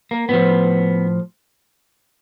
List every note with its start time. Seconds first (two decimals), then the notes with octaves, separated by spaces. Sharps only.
0.11 A#3
0.29 A2 F3 B3